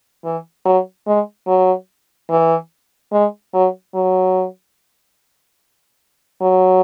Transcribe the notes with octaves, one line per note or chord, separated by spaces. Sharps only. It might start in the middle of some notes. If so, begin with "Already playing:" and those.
E3
F#3
G#3
F#3
E3
G#3
F#3
F#3
F#3